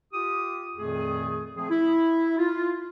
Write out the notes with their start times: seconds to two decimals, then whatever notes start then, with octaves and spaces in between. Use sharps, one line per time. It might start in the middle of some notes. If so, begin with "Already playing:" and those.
0.12 F4 G4 D#6
0.77 F2 A#2 D#3 A3 G#4
1.55 F3 A3 C4 G#4
1.70 E4
2.38 F4